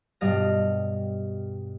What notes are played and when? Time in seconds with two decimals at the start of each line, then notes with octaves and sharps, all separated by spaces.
0.21 G2 B2 G3 D#5 F5 A#6